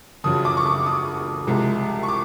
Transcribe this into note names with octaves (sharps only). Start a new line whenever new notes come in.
F#1 F2 C#3 F#3 D#6
D6
C#6
D6
D#6
C2 C3 F3 G#3
C#6
D6